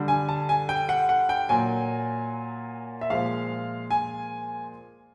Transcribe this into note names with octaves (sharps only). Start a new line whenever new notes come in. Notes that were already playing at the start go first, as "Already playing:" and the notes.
Already playing: D3 G3
G#5
A5
G#5
G5
F#5
F#5
G5
A#2 F#3 G#5
E5
A#2 F3 G#3 F5
G#5